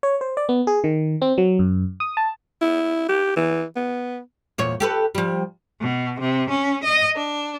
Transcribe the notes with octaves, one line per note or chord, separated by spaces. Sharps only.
C#5
C5
D5
B3
G#4
D#3
C4
F#3
F#2
D#6
A5
E4
G4
E3
B3
E2 A#2 C#5
G4 A4 B4
F3 G3
B2
C3
C#4
D#5
D4